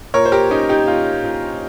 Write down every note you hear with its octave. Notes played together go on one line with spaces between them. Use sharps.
A#2 A#4 C#5
C5
G4 A#4
C#4 D#4 G4
D#4 G4
A#2 F4
A#2